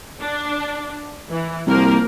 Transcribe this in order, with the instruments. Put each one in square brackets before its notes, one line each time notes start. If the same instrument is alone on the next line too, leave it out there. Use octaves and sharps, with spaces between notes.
[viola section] D4
E3
[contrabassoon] C2 [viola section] F3 A#3 A#4